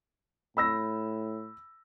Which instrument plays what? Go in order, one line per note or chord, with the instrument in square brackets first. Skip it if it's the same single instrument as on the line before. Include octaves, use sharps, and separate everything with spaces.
[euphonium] A2 [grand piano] B5 E6 A#6